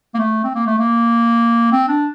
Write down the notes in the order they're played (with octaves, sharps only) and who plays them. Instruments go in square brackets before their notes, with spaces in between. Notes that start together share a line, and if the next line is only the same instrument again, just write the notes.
[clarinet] A#3
A3
C4
A#3
A3
A#3
C4
D4